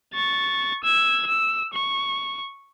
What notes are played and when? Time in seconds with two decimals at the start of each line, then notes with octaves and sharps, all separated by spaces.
0.14 C#6 A6
0.83 E6 G#6
1.27 E6
1.74 C#6